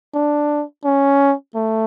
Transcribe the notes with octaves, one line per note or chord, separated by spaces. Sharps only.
D4
C#4
A3